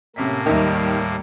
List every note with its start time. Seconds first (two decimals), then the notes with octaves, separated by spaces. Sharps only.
0.16 A2 C3 A#3 C#4 B6
0.46 D#2 D#3 G3 D#4 E5